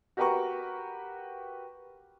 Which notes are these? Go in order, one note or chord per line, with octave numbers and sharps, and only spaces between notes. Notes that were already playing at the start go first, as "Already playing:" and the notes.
F#4 G4 A#4 B4 A#5 C#6